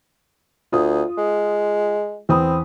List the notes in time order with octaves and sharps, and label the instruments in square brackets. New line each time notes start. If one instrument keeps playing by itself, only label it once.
[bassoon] D2 [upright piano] F4 D#6
[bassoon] G#3
[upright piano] E2 B5 D#6 [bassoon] C4